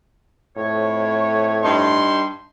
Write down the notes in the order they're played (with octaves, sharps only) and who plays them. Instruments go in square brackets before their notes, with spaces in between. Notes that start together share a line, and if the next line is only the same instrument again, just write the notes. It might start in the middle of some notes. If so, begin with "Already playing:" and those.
[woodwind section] F2 C#5 [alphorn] A2
[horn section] G2 D#4 C6